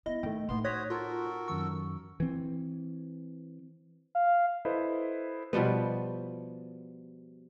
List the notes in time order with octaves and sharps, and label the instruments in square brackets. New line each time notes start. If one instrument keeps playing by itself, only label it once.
[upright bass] B3 [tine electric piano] E4 [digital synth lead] D#5
[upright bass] D#3 [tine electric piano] A3 G5
[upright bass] A2 D#4 [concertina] B3 C6
[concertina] F#4 C5 D#6 [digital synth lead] C#5 [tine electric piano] F#6 A#6 B6
[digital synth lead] F4 [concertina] F#4 A4 A#4
[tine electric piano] F#2 D#3 C#6 [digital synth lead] E6
[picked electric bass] E3 C4
[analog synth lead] F5
[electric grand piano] E4 A4 B4 C5 D#5
[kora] B2 F3 G3 B3